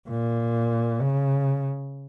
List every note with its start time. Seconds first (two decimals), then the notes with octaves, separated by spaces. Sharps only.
0.09 A#2
1.01 C#3